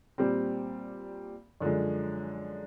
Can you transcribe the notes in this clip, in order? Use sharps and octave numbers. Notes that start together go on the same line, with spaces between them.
A#2 G3 C4
F#2 D3 F3 G#3